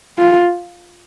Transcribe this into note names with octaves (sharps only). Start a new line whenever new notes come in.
F4